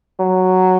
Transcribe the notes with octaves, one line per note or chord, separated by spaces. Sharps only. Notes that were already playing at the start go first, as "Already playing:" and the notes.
F#3